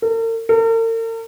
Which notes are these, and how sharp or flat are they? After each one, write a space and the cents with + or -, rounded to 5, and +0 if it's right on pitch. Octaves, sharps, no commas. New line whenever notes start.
A#4 -45
A#4 -45